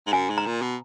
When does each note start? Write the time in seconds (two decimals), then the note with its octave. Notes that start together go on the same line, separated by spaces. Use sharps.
0.07 G#2
0.13 F#2 G#5
0.30 G#2
0.38 A#5
0.46 A#2
0.62 B2